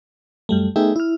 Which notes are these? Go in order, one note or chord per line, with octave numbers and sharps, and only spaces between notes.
F#2 G3 A3
A3 B3 D#4 G#4 E5 G5
E4 F6